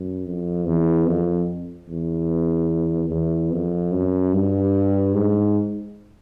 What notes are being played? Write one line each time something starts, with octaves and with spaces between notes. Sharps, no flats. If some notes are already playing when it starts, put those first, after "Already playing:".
Already playing: F#2
F2
E2
F2
E2
E2
F2
F#2
G2
G#2